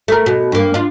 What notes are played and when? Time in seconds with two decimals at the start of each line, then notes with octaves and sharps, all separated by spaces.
0.08 A3 A#4
0.26 B2
0.52 G2 A#3
0.74 D4 F4